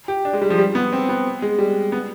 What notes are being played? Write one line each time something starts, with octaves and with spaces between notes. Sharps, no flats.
G4
D4
G#3
G3
F3
G3
B3
C4
B3
G#3
G3
B3